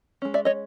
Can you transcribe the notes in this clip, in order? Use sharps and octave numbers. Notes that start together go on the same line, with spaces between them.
G#3 C#4
D5 E5
C#5 D#5